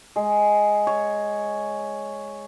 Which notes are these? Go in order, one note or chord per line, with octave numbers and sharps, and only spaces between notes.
G#3
C#5